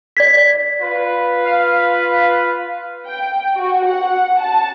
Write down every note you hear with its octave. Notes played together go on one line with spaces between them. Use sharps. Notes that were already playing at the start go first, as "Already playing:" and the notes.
D5 G#6 B6
F4 B4
F5
G5
F#4
F#5
A5